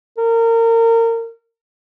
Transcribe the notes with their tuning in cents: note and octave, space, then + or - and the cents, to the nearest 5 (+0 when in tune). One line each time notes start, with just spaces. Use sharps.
A#4 -30